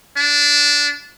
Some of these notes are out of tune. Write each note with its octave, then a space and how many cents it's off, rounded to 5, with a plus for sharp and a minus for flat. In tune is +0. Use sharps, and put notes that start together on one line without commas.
D4 -15